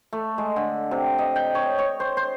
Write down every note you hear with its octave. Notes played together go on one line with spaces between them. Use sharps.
A3
G#3
D3
C3
D#5
G5
C#5
C#5
C5
C5